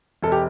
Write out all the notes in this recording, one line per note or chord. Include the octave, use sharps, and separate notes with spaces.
E1 A4
G4